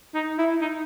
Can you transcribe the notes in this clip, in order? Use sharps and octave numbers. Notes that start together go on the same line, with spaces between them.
D#4
E4
D#4